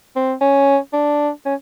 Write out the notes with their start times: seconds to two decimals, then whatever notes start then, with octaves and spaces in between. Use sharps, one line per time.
0.16 C4
0.41 C#4
0.93 D4
1.45 C#4